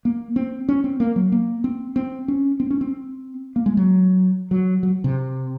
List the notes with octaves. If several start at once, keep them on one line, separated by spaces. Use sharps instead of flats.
A#3
C4
C#4
C4
A#3
F#3
A#3
C4
C4
C#4
C4
C#4
C4
A#3
G#3
F#3
F#3
F#3
C3